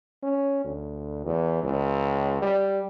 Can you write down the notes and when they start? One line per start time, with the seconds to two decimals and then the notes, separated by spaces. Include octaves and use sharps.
0.23 C#4
0.65 D2
1.26 E2
1.63 C#2
2.42 G3